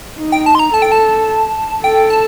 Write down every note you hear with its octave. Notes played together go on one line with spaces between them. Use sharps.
D#4
G5
A5
C6
A#5
A4 A5
G5
A5
A4 G5
A5